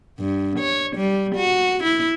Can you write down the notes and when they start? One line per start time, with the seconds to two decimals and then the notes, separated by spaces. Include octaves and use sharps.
0.20 G2
0.59 C#5
0.97 G3
1.35 F#4
1.84 E4